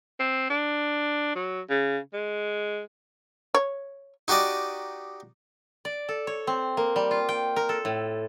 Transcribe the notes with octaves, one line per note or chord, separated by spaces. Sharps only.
C4
D4
F#3
C#3
G#3
C#5
D#4 F#4 G4 D5 D#5
D5
A4
C#5
C4
A#3
G3
F4
G5
A#4
A4
A2